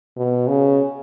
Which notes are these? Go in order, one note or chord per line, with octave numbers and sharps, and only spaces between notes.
B2
C#3